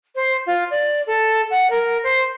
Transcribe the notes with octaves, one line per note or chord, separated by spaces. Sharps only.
C5
F4
D5
A4
F#5
A#4
C5